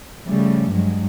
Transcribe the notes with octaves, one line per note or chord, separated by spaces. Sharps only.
C#3 F3 G3 A3
G2 F#3 G#3